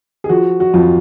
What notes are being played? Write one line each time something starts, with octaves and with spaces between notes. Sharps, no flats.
G#4
F3 F#4
F#4
F2 F4